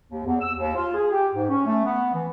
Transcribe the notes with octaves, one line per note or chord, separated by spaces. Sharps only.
D#2
E2
E6
D#2
F4
G#4
G4
G#2
C#4
A3
B3
E3